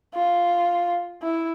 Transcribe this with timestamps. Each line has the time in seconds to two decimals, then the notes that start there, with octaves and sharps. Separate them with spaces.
0.14 F4
1.22 E4